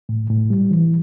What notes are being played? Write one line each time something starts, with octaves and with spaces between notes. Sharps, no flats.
A2
A2
G3
E3